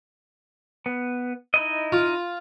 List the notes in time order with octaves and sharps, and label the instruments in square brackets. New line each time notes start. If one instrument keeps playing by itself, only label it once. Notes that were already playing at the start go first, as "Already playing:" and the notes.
[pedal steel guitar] B3
D#4 E4 D#5
[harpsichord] F4